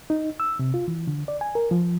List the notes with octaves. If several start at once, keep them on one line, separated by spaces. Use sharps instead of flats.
D#4
E6
C3
F4
E3
D3
D5
G#5
A#4
F3